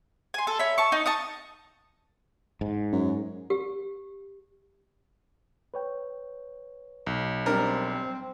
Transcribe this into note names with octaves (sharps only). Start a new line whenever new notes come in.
G#5 C6
A4
C#5 E5 B5
A5 C#6
D#4
A5 C#6 D#6
G#2
F#2
G4
B4 C#5 G5
B1
G3 C4 D4 A#4 C5